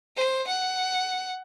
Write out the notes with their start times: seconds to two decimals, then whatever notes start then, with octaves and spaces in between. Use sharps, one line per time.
0.16 C5
0.47 F#5